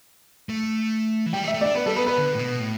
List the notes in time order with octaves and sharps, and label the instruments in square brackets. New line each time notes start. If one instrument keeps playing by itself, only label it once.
[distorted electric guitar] A3
E3
[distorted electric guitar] G3 [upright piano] G5
[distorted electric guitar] A3
[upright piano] E5
[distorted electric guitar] A3
[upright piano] D5
[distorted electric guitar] D4
[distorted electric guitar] B3 [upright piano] B4
[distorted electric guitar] G3 [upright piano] A4
[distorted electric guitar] B3 [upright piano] B4
[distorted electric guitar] B3 [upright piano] B4
[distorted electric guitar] D3
A2
B2
A2